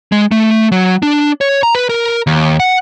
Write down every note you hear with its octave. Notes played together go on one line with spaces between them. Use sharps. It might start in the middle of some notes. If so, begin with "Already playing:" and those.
G#3
A3
F#3
D4
C#5
A#5
B4
A#4
D#2
F#5